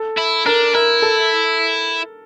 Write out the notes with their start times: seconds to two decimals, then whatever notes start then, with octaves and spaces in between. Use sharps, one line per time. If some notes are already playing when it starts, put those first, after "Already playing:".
Already playing: A4
0.17 E4
0.46 D4 A#4
0.74 E4 A#4
1.02 A4